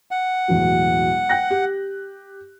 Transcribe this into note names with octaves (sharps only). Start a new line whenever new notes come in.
F#5
E1 A1 F#3
G5 F#6 A#6
G4